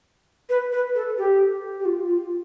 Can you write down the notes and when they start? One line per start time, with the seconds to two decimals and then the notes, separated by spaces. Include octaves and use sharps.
0.49 B4
0.72 B4
0.95 A4
1.18 G4
1.80 G4
1.85 F4
2.08 F4